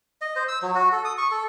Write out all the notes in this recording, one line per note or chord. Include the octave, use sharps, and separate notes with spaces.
D#5
C5
E6
F#3
F#4
A4
D#6
C#6
A4